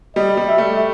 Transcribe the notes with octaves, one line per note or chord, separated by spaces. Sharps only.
G3 D#5
G3
E5
A3